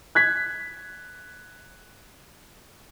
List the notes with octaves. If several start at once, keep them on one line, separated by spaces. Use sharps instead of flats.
F#6 G#6 B6